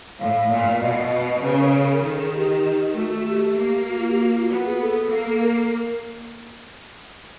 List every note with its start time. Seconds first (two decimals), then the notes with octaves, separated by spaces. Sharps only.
0.20 A2 F5
0.52 A#2
0.82 B2 D#5
1.43 C#3 B4
1.59 A#4
2.05 D#3 A4
2.20 G#4
2.35 G4
2.96 A3 F#4
3.07 F#4
3.17 F#4
3.27 G4
3.58 A#3
3.89 F#4
3.99 F4
4.10 G4
4.20 F#4
4.35 F4
4.50 B3 F#4
4.66 G#4
4.81 A4
5.11 A#3
5.42 A#4